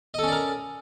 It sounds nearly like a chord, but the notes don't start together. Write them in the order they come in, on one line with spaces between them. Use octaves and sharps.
D#5 A4 C#4 D5 A#4